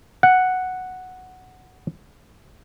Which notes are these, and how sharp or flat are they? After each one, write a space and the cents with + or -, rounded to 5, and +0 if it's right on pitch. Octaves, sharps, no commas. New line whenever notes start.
F#5 +0